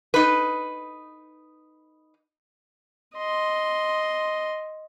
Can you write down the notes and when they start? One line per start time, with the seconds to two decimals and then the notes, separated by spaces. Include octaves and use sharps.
0.14 D#4 B4
3.16 D#5 C6